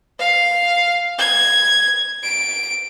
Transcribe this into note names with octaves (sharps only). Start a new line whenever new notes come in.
F5
G#6
D7